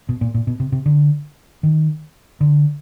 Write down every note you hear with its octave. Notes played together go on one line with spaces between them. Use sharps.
B2
A#2
A#2
B2
C3
C3
D3
D#3
D3